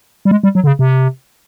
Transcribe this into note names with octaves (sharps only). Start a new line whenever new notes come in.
G3
G#3
G3
F#3
D3
C#3
C3